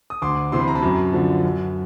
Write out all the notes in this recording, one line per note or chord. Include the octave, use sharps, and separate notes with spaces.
D#6
D2 C6 D6
C3 E3 C6
B5
A#5
A5 B5
F#2
D3 F3
F#2